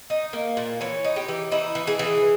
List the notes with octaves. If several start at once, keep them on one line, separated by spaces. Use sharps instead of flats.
D#4
A#3
A#2
E3 C#5
D#4
G4
E3
D#4 E4
E3
G#4
E3